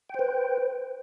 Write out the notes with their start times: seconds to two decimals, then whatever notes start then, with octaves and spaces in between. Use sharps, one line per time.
0.09 G5
0.14 C5
0.19 B4